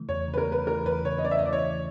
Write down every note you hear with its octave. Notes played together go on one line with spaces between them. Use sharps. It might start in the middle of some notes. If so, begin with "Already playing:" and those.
Already playing: C#3 E3 A3
E2 C#5
C#3
B4
A#4
A3 B4
E3 A#4
E2 B4
C#3 C#5
D#5
A3 D5
E5
D#5
E3 D5
C#5
E2